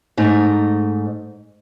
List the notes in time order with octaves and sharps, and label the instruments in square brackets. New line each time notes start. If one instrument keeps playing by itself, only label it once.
[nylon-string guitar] G#2 A3 D#4